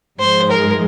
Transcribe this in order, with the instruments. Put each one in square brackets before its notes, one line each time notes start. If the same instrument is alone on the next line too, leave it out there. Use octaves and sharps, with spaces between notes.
[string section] G#2 F3 G#3 [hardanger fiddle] C5
[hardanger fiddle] A#4